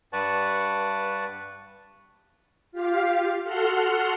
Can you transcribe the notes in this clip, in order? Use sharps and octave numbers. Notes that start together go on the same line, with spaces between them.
G2 B4 D5 F#5 A5 C#6
F4 G4 F5
F#4 A4 F#5 C6 F6